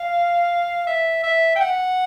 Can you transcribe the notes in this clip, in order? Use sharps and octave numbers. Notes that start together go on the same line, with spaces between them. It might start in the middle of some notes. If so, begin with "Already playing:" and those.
Already playing: F5
E5
E5
G5
F#5